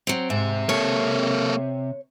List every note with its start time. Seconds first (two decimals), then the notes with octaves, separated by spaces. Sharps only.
0.07 F#3 C4
0.30 G#2 C3 E5
0.69 A#3 A4 C#5